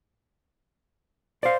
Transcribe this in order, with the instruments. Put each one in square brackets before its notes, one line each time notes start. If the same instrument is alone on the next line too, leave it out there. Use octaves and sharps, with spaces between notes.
[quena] C5 [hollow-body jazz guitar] D5 F5